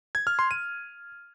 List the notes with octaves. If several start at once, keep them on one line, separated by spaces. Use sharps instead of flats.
G#6
F6
C6
D#7